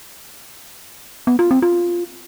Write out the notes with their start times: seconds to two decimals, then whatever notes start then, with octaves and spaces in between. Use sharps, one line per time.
1.27 B3
1.39 F4
1.51 C4
1.62 F4